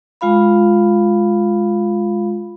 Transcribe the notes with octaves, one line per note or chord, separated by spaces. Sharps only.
G#3 F4 F5 B5